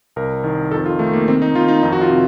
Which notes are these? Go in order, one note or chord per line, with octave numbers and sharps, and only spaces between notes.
C2 A#4
D#3
F2 A4
F4
D#3 A3
A#3
D#3 C4
D#4
D#3 F4
D#4
F2 D#4
F#4
F4
C3